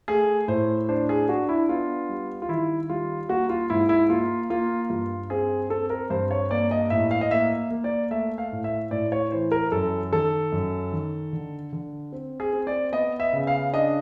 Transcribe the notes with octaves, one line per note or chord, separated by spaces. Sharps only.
A3 G#4
A2 C5
D4 C5
G#4
D4 F#4
E4
B3 F4
G3
F4
D#3 E4
G3 F4
A#3 F#4
F4
G#2 E4
E4
A#3 F4
A#3 F4
G2 F4
C4 G#4
C4 A4
A#4
G2 C5
C#5
A#3 D5
D#5
A2 E5
F5
D#5
A#3 E5
A#3
D5
A3 E5
F5
A2
E5
A2 D5
C#5
E3 C5
A#4
F#2 A4
D#3 A4
F#2
D#3
D3
D3
C4
G#4
C4
D5
B3 D#5
E5
C#3
F5
D4 D#5